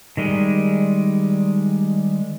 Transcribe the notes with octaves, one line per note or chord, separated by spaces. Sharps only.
D#3 G3 G#3